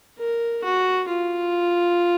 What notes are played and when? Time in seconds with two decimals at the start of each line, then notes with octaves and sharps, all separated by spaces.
0.19 A#4
0.64 F#4
1.09 F4